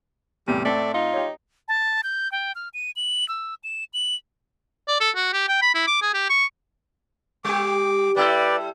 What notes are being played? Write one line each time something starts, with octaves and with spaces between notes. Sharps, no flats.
E2 A2 C3 G3
A2 A3 C4 D5
D#4 F4
G4 C#5
A5
G6
G5
F6
D#7
F#7
E6
E7
F#7
D5
A4
F#4
G4
G5
B5
E4
D6
G#4
G4
C#6
G3 G4 D6
G3 E4 G4 A4 B4 D5